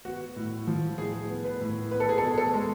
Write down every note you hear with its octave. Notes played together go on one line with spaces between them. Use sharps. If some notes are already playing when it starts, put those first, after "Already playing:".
B3 F#4
A2
F3
A2 G#4
B3
B4
A2
B3 B4
A4
G#4
B2 A4
G#4
A4
G#3